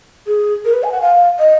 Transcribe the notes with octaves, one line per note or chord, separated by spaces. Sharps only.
G#4
A#4
B4
G#5
F#5
F5
D#5